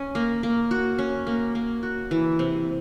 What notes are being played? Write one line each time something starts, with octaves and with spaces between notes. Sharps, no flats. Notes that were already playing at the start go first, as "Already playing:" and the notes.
Already playing: C#4
A#3
A#3
F#4
C#4
A#3
A#3
F#4
E3
C3